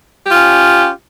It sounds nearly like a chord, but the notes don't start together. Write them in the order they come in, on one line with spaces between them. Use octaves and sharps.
G4 F4 C#4